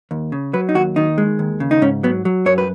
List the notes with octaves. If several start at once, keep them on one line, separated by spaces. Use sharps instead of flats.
D#2
C#3
F#3 B4
D#4
D#2 F#4
D#3 D#4
G#3
D#2
C#3
D#4
G#2 C#4
F#3 B3
F#3
F#2 C#5
B4